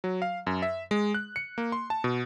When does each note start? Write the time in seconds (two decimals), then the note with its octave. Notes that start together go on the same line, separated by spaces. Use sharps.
0.04 F#3
0.22 F5
0.47 F#2
0.62 E5
0.91 G#3
1.14 F#6
1.36 C#7
1.58 A#3
1.72 C6
1.90 A5
2.04 B2